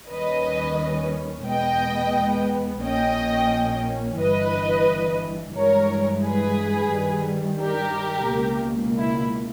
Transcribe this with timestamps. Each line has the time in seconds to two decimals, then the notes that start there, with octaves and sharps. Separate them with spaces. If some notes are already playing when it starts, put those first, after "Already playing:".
0.10 D#2 D#3 G3 C#4 B4 D#5
1.47 E2 B2 G#3 B3 D#5 G5
2.83 A#1 A#2 A#3 C#4 D#5 G5
4.20 G1 G2 E3 B4 D#5
5.57 G2 E3 G#3 A#4 C#5
6.24 G#4 B4
6.93 G2 D#3 G3
7.61 G4 A#4
8.30 C#2 B2 A#3
8.98 E4